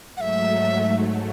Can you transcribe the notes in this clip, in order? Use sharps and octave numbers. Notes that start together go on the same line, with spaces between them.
G#2 F#3 A3 E5 F#5